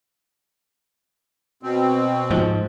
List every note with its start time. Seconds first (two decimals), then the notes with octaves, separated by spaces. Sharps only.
1.63 B2 C4
2.31 G#2 F3